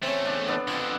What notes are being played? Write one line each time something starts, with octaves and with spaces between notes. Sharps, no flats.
E2 A3 C4 C#4
D4
B3 D4 A4
F2 D3 F4